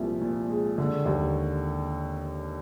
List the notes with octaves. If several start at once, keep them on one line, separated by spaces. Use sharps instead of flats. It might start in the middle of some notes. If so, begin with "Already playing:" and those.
Already playing: C2 A#2 F3 G#3
A#2
G#3
D3
D#2